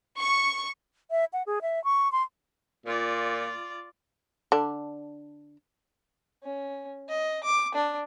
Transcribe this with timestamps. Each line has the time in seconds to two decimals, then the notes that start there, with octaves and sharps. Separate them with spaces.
0.16 C#6
1.11 E5
1.33 F#5
1.46 G#4
1.62 E5
1.84 C#6
2.12 C6
2.86 A#2 F4 D5
4.52 D3 D4
6.44 C#4
7.09 D#5
7.44 D6
7.75 D4